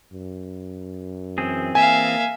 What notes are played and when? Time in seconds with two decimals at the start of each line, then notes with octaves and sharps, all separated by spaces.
0.13 F#2
1.38 E3 C4 G#4
1.75 A#3 E5 F5 G#5